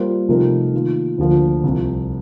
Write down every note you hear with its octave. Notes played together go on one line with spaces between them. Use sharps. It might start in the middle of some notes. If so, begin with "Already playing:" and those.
Already playing: G3 A#3 F4 C5
C3 F3 A3 D#4 A#4
D#3 A#3 F4
D2 D3 F3 A#3
C2 C3 F3